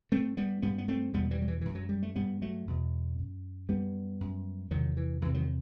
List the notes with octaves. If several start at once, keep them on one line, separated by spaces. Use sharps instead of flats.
G2 A3 C4
G3 B3
G2 G3 B3
B3
A3 C4
E2 B2 G3 B3
E3 G3
F#3
E3
F#2 E3
F#3
G3
A3
G2 G3 B3
F#3 A3
E2 B2
F#2
F#2 G3 B3
F#2
E2 C3 D#3 F#3
E3
E2 C3 E3
D#3 F#3